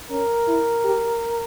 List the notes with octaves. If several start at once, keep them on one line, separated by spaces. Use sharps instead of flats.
C#4 A#4
E4
G4